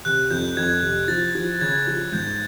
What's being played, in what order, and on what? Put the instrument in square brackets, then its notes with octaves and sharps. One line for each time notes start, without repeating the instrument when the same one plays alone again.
[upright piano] C3 [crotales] F#6
[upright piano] F2 [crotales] G6
[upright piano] F2 [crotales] G#6
[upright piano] C3
[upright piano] F3 [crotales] A6
[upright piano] F3
[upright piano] C#3 [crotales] G#6
[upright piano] F3
[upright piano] G#2 [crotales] G6